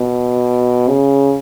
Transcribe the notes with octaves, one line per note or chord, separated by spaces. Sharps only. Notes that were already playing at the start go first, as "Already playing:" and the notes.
Already playing: B2
C#3